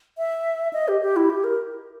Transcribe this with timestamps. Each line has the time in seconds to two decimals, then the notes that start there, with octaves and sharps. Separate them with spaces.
0.18 E5
0.73 D#5
0.88 G4
1.02 G4
1.16 E4
1.30 G4
1.44 A#4